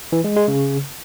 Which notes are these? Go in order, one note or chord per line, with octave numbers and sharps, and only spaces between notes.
E3
G#3
G#3
C#3